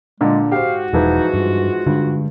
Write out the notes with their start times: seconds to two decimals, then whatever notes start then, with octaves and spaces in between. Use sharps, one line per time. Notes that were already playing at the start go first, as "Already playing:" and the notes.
0.21 A#2 D3 G#3
0.52 G#2 F#4 G4 C5 F5
0.93 E1 E3 F3 G#3 D#4
1.34 G2 F4
1.86 G2 D3 G#3